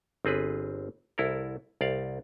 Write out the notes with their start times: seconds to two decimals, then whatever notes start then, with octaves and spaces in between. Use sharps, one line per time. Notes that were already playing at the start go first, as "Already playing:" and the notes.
0.25 G1 C4 G#4 B4
1.18 C2 E4 A4 A#4
1.81 C2 D5 F5